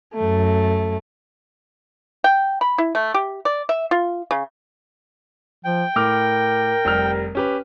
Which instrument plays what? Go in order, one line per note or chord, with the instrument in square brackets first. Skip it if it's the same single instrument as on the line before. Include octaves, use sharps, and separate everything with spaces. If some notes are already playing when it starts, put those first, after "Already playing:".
[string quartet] F#2 A3
[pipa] G5
B5
E4
A3
G4
D5
E5
F4
C#3
[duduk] F3 [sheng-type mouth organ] G5
[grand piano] A2 D6 F6 [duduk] A#4
[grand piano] F1 G3 F6
C#4 G4 B4